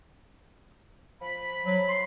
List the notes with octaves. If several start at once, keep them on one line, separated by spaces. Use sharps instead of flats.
F3 B5
F#3
C6